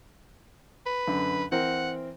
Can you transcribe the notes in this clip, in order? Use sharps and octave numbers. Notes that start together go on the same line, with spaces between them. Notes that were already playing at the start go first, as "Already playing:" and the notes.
B4
F#2 D3
E3 C4 A#4 F#5